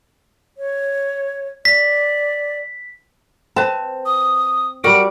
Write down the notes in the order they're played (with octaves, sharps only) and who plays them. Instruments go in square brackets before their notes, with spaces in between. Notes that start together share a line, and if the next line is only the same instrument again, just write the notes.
[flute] C#5
[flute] D5 [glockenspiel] B6
[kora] C4 [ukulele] B4 A5
[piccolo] D#6
[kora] G3 D5 [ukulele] F#4 A#4 F#5 [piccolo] D7